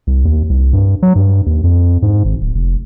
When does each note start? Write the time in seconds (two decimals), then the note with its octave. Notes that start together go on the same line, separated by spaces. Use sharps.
0.07 C2
0.25 D#2
0.50 C2
0.73 G2
1.02 F#3
1.15 G2
1.46 D#2
1.64 F2
2.02 G#2
2.25 G#1
2.41 D1
2.55 F1